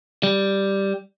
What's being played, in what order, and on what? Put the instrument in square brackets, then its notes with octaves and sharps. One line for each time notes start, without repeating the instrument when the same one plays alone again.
[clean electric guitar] G3